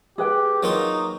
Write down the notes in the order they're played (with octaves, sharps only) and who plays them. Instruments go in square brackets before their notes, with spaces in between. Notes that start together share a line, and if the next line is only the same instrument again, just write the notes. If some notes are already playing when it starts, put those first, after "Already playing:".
[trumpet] G4 [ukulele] G#4 B4 G5
[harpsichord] F#3 A#3 F4 [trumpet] D#4